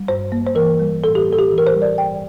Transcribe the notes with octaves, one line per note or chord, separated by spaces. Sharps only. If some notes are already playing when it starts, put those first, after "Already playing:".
Already playing: G3
G2 C5
A#3
C5
E3 A#4
G3
A2 A4
G4
A#3
A4
G4
E3
A#4
C5
G3
D5
G2 G5